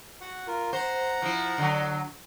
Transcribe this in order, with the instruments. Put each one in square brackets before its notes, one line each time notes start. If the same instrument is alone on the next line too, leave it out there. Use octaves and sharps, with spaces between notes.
[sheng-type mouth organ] F#4 F#5
F4 A#4
[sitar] C5 [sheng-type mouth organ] F#5 A#5
[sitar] F3 E4
D3 F#3